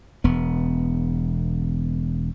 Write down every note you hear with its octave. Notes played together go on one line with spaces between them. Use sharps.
E1 B3